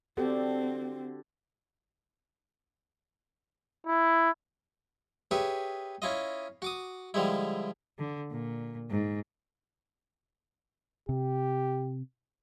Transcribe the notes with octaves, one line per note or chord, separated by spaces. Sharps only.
D3 C4 F#4 G4 A4
E4
G4 G#4 B4 C#5 E5
C#4 E4 F4 D#5
F#4 D6 D#6
D3 F3 G3 G#3 E4
D3
A#2
G#2
C3 G4